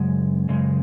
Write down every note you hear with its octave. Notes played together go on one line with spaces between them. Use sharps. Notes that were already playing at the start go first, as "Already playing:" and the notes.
Already playing: F#2 C#3 G#3
F#2 C#3 G#3